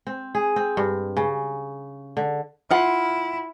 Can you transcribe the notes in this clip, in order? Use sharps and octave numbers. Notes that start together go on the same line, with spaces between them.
C4
G#4
C4
G2
C#3
D3
E4 F4 F#5